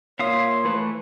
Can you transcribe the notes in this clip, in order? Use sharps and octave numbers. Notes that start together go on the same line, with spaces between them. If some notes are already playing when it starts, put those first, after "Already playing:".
A#2 C#5 E5 F5 C6 D#6
E3 A3 B4